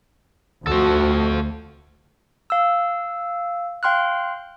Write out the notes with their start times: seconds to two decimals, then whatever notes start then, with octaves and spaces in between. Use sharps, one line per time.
0.67 D2 A3 F#4 A4 C5
2.50 F5 E6
3.83 F5 G5 C6 F6 F#6